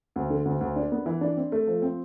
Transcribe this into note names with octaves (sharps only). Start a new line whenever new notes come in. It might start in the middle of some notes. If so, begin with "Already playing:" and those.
D2
D3
D2
D2
D4
B3
E3
D4
C4
A3
F3
C4